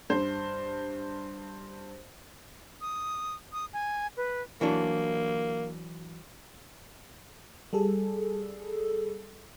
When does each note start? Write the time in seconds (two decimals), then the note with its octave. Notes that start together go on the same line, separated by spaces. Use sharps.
0.10 G2 C5
2.81 D#6
3.53 D#6
3.73 G#5
4.17 B4
4.61 E3 F#3 A#3 D4
7.73 G3 G#4 A4